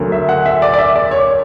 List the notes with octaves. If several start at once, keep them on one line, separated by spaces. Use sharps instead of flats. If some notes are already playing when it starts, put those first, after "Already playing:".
Already playing: D2 D3 F#3 A#3
E5
F#5
E5
D5
D5
E5
D5
C#5